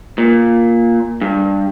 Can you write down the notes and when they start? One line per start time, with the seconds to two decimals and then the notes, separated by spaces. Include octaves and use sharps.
0.18 A#2
1.21 G2